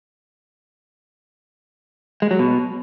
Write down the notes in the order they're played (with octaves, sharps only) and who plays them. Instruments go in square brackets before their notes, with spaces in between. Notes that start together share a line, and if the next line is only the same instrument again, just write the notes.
[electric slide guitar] G#3
F#3
B2